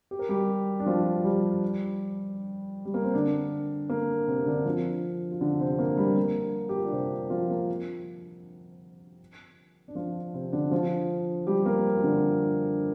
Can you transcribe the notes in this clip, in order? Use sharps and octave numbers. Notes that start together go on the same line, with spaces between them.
G4
A#4
G3 G4
D4
F3 F4
G3 G4
G3
A#3
C4
D3 D4
A#3
C3 C4
D3 D4
F3 F4
F4
D3 D4
C3 C4
A#3
G3
A#3
G4
F4
D4
C3 C4
F3 F4
A#3 A#4
D4
F3 F4
C3 C4
D3 D4
F3 F4
G3 G4
A#3 A#4
F4
D3 D4